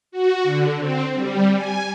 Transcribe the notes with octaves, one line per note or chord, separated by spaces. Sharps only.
F#4
D3
C4
G3
G#5